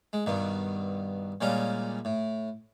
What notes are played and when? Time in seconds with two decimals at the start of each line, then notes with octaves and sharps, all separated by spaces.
0.13 G#3
0.26 G2 B2 D#3
1.41 A#2 C#3 G3 G#3 C#4 F4
2.05 A2